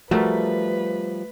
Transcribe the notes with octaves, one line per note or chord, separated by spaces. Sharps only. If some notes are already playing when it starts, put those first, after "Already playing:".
F3 G3 A3 F#4 A#4 B4